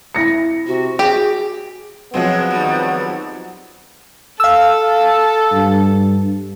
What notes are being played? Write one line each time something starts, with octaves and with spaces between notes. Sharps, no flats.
E4 A#6 C#7
C3 F#4
G4 G#4
F3 F#3 G#3 B3 C4
D#3 G3
A4 F5 E6
G2